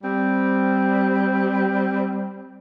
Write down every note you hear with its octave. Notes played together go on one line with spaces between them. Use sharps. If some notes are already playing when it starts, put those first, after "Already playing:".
G3 C4